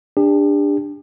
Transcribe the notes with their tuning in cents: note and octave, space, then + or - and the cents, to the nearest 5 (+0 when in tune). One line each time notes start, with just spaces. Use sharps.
D4 +0 G4 +40